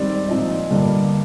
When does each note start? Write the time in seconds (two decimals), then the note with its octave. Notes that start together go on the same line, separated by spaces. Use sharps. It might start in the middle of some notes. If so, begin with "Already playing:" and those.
Already playing: G#2 D#3 G3 C4 D5
0.28 A#2 F3 C4 D#4 D#5
0.71 G2 D3 G3 A#3 D4